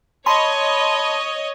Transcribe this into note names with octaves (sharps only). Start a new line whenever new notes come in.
C#5 D#5 A5 B5 C6